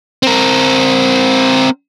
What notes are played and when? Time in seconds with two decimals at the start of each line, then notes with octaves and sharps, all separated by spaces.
0.23 C4 A#4